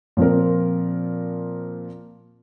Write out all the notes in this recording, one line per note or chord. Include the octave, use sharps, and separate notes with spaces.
A#2 F3 C4 F4 A#4